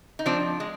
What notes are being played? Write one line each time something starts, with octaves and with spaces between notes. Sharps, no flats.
D#4
F3 C4 D4
G#3